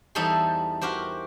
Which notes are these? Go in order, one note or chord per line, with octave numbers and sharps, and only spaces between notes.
E2 G3 D#4 A4 C5 C6
F#4 G4 A#4 C5